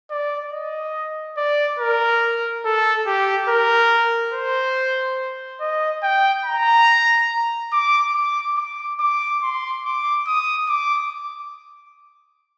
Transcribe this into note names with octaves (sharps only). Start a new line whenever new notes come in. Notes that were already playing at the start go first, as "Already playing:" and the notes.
D5
D#5
D5
A#4
A4
G4
A#4
C5
D#5
G5
A#5
D6
D6
D6
D6
C6
D6
D#6
D6